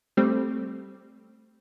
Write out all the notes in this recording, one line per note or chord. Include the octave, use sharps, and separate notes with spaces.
G3 A3 C4